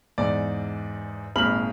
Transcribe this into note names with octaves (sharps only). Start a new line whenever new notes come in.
E2 G#2 D5
D#1 G#1 G#3 B5 F6 F#7